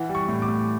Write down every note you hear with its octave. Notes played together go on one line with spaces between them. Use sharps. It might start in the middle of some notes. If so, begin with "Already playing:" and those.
Already playing: E3 F#5
G3
C#6
A2
D6
A2